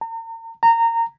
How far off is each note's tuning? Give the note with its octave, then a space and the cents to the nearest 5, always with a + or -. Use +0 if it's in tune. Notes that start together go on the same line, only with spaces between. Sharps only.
A#5 -40
A#5 -20